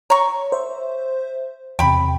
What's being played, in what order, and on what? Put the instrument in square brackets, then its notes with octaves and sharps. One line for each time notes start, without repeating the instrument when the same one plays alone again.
[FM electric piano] C#5 [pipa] A#5 C#6
[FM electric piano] C5 E5
[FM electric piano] E2 C3 [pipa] G5 B5